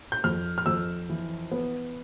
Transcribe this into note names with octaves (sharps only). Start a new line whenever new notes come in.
G6
F2 F6
F6
F2 E6
E3
B3